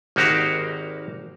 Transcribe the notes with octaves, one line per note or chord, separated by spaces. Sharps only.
G#1 A#3 D#4 F#4 G4 F5